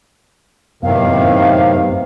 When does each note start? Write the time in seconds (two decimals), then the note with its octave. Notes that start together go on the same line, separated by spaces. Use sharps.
0.83 F#2 A2 C3 D#3 B3 F5